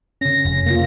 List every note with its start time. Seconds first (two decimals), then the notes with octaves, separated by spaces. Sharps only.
0.21 C#3 C#4 A#6
0.45 F1
0.66 A#3 F4 A#6